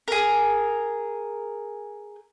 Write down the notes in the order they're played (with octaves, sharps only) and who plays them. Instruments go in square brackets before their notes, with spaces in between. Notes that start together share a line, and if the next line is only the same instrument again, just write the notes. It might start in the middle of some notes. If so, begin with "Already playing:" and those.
[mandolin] G#4 A#4